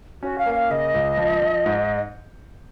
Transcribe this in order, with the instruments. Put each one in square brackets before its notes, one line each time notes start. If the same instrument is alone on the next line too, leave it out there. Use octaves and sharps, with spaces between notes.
[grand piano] C#4 [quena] F#4
[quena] F5
[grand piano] A#3
[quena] F5
[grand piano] C#3 [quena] D#5
[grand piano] C#2
F3
F3
G#2